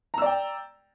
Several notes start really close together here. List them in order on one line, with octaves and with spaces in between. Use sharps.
A#5 E6 D5 G5